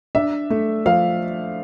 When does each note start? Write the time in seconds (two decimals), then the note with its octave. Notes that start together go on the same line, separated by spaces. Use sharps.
0.15 D4 E5
0.50 A3
0.86 F3 F5